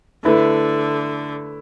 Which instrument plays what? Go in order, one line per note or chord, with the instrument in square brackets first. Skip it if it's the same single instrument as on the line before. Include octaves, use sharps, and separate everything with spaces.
[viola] D3 [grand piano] A3 E4 B4